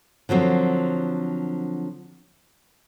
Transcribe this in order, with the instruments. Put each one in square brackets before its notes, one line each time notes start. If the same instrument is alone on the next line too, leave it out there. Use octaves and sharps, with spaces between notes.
[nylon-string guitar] D3 F3 F#3 C4